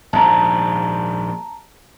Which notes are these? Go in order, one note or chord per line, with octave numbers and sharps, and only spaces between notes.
A#1 D#2 G#2 A5 A#5